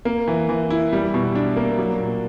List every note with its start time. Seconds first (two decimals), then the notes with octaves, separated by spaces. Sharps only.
0.05 A#3
0.28 E3
0.49 E3
0.70 E4
0.93 G3
1.14 B2
1.35 D4
1.56 A#3
1.78 F#3
1.99 A#2